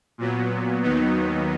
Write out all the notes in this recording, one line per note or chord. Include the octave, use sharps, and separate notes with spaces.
A#2 F#3 B3
D#2 D#3 F#3 B3 D#4